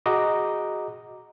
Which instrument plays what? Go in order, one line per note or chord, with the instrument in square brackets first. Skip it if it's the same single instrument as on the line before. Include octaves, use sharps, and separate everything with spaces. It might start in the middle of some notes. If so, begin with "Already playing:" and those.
[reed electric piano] F#4 G#4 D#5 A#5 D6